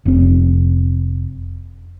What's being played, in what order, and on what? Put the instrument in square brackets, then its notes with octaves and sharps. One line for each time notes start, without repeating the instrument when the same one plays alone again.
[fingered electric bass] F1 C4